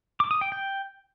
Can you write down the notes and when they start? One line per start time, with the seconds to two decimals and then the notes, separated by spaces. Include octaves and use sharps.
0.20 D6
0.31 D#6
0.41 G5
0.52 G5